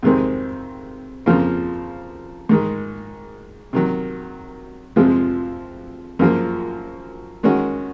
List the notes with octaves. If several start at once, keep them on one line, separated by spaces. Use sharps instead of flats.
F2 C3 D#3 G#3 C4
F2 C#3 F3 A#3
G#2 D#3 G#3
C3 D#3 F#3
F2 C3 F3 G#3
F#2 C#3 F3 A#3
D#3 G#3 C#4 F#4